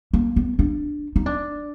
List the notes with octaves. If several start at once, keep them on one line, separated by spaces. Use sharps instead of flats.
A#3
B3
D4
D#4
D4